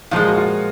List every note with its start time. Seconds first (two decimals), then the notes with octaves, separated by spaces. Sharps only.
0.11 A#2 F3 G#3 F4
0.28 F#4
0.37 F4